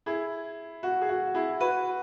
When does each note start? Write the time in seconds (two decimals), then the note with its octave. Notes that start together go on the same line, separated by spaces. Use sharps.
0.06 E4 G#4
0.83 F#4
1.01 G#4
1.09 F#4
1.35 E4 G#4
1.60 F#4 B4